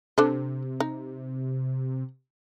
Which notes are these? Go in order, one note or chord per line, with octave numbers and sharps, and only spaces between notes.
C3 D4 A4 C5
D#4